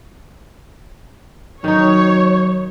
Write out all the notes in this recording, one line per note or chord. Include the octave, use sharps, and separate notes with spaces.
D#3 F#3 D#4 C#5